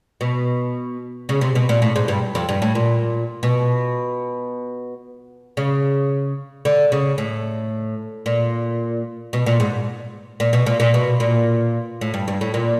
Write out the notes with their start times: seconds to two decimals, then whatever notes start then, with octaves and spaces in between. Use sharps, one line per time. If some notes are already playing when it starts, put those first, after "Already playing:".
0.21 B2
1.29 C#3
1.41 C3
1.55 B2
1.69 A#2
1.82 A2
1.96 G#2
2.08 G2
2.35 F2
2.49 G2
2.62 A2
2.75 A#2
3.43 B2
5.57 C#3
6.65 D3
6.92 C#3
7.18 A2
8.26 A#2
9.33 B2
9.46 A#2
9.60 G#2
10.40 A#2
10.53 B2
10.66 A#2
10.80 A#2
10.94 B2
11.20 A#2
12.01 A2
12.14 G2
12.28 G2
12.41 A2
12.54 A#2